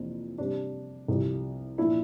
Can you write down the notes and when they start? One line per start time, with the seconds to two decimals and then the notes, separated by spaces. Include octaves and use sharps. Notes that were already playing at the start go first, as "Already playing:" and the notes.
Already playing: F2 C3 E3 A#3 D4
0.38 C3 G3 C4 D4
1.08 C2 C3 F3
1.78 A#2 F3 A#3 D4 E4